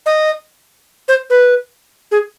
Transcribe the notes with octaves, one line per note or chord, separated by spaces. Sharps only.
D#5
C5
B4
G#4